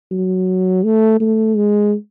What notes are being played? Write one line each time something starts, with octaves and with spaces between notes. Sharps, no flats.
F#3
A3
A3
G#3